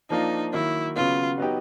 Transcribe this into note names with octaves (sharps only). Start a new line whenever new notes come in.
F3 A#3 D4 D#4 F4
D#3 F#3 A#3 E4
C#3 F#3 B3 F4
F#3 B3 D#4 G4